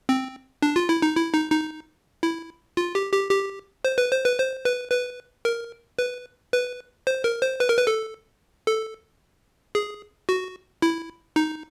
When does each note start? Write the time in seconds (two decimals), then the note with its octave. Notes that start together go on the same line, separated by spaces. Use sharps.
0.09 C4
0.62 D4
0.76 F4
0.89 E4
1.02 D#4
1.16 E4
1.34 D#4
1.52 D#4
2.23 E4
2.77 F4
2.95 G4
3.13 G4
3.31 G4
3.85 C5
3.98 B4
4.11 C5
4.25 B4
4.38 C5
4.65 B4
4.92 B4
5.45 A#4
5.99 B4
6.53 B4
7.07 C5
7.24 A#4
7.42 C5
7.60 B4
7.69 A#4
7.78 B4
7.87 A4
8.67 A4
9.75 G#4
10.29 F#4
10.82 E4
11.36 D#4